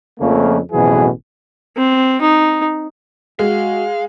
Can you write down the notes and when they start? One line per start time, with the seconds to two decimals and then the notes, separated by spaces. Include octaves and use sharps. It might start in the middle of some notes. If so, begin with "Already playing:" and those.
0.20 F2 C#3 F3 A3 A#3
0.72 A1 F2 B2 E3 F#3 G#4
1.77 C4
2.21 D#4
3.39 G#3 F#4 F5